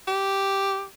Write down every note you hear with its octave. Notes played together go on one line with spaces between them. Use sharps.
G4